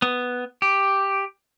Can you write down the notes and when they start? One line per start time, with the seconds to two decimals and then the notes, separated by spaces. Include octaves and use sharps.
0.02 B3
0.62 G4